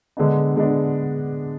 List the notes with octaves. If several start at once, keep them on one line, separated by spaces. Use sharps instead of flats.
D3 G#3 B3 D4
D3 G#3 B3 D4